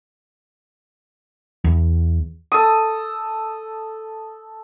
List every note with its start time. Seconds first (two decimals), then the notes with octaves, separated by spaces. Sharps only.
1.64 E2
2.52 A4 D#6